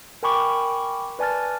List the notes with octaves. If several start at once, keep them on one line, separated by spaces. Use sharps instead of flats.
A#4 G5 G#5 B5 C#6 D6
B4 D5 G#5 A5 F6 A6